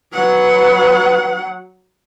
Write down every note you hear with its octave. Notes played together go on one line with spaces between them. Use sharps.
F#3 B4 F#5